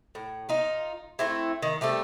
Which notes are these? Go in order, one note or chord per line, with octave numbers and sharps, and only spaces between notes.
A2
D#4 F4
A3 C4 E4
D#3
G3 A3 C4 A4